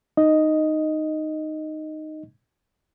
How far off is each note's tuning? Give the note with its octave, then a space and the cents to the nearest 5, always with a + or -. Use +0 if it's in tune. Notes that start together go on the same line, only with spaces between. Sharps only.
D#4 -10 D#5 +0